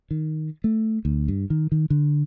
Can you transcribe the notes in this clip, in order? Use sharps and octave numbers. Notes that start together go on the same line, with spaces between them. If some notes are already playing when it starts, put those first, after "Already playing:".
D#3
A3
D2
G2
D#3
D#3
D3